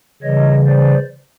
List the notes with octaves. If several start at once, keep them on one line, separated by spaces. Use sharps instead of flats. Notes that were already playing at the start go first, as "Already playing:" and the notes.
C#3 E3 G3 C#5 D#5
C5 D5